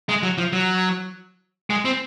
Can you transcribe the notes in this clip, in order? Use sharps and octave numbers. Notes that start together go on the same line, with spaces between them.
G#3
F#3
F3
F#3
G#3
C4